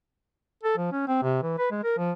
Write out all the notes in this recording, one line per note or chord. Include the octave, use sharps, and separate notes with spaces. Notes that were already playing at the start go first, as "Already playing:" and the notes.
A4
F3
C#4
C4
C3
E3
B4
G#3
A#4
F3